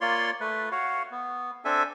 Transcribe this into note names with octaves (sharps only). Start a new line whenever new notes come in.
A#3 F4 C#5 D5 C6
A3 B4
F#4 C#5 F5 F#5
B3
C4 D4 A4 E5 G#5